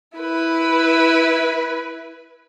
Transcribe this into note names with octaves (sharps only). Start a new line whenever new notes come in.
E4 B4